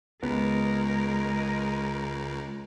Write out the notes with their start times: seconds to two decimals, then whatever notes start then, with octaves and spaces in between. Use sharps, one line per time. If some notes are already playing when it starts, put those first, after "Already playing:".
0.23 C#2 G#3 B3 A#4